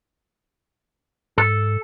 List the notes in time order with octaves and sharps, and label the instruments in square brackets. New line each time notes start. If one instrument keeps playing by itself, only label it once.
[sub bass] G#2 [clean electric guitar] A4